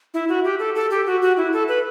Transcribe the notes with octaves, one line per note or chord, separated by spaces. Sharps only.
E4
F#4
G4
A4
A4
G4
F#4
F#4
E4
A4
B4